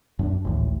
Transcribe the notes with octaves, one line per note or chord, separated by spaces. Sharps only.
F#2 C#4 D4
G#1 D2 A2 E3